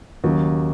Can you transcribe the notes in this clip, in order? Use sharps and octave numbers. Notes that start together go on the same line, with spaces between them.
D#2 C#3 F#3